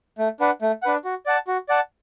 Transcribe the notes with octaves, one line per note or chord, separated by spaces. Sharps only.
A3
D4 B4 F#5
A3
D4 B4 F#5
F#4
D5 F#5 A5
F#4
D5 F#5 A5